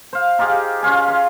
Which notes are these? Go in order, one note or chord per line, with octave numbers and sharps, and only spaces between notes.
C5 F5
D#4 F4 G4 G#4
C#4 F4 F5 G#5
F5 C6